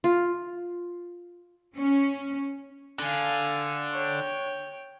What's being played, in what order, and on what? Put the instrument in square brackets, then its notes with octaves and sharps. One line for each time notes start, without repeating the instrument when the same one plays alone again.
[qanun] F4
[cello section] C#4
[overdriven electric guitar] D3 [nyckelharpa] F5 G#5
[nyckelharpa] C#5 G5